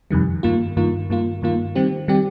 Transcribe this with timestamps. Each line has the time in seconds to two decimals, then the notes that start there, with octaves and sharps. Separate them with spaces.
0.11 F2 C3 D#3 G3
0.43 G2 D#3 A#3 F4
0.77 G2 D#3 A#3 F4
1.10 G2 D#3 A#3 F4
1.42 G2 D#3 A#3 F4
1.75 D#3 G3 C4 G4
2.08 D#3 G3 C4 G4